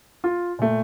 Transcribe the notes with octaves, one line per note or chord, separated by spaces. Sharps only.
F4
A#2 A3